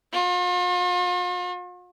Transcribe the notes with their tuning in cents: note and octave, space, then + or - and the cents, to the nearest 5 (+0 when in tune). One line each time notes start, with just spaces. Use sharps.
F4 +45